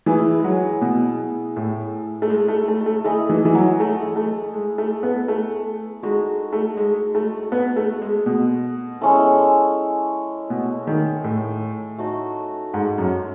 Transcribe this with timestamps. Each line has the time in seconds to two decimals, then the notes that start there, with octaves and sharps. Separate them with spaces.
0.06 E3 E4 G#4 B4
0.40 G#3
0.44 F#3
0.81 B2
1.56 A2
2.22 A3
2.30 G#3
2.48 A3
2.68 A3
2.86 A3
3.04 A3 E4 G#4 D#5
3.30 E3
3.45 E3
3.55 F#3
3.80 A3
4.16 A3
4.54 G#3
4.78 A3
5.03 B3
5.28 A3
6.02 G#3 D#4 F#4 A4
6.53 A3
6.77 G#3
7.15 A3
7.52 B3
7.76 A3
8.02 G#3
8.26 B2
9.01 G#3 C#4 E4 A4
10.50 B2
10.87 D#3
11.24 A2
11.98 A3 D#4 F#4 A4
12.74 G#2
12.98 F#2